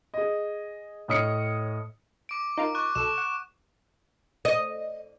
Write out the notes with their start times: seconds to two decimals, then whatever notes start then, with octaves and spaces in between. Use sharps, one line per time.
0.14 G#4 D#5
1.08 A2 C#5 D#5 D#6 F6 C#7
2.29 D6 D7
2.57 D#4 F4 A#4 D7
2.75 C#6 D6 F#6
2.95 B1 A4 E7
3.18 F#5
4.45 D#5